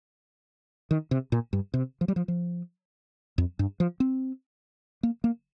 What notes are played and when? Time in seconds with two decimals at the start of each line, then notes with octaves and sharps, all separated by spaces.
0.91 D#3
1.11 C3
1.32 A#2
1.53 G2
1.74 C3
2.01 F3
2.08 G3
2.16 F3
2.28 F3
3.38 F2
3.59 G2
3.80 F3
4.00 C4
5.03 A#3
5.24 A#3